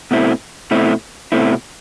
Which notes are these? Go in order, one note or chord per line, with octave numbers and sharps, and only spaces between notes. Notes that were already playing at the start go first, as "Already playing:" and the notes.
B2 A3 C4 E4
B2 A3 C4 E4
B2 A3 C4 E4